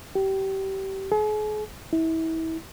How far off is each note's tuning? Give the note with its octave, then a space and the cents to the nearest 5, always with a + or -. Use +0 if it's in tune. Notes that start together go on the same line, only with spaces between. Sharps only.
G4 -25
G#4 +40
E4 -30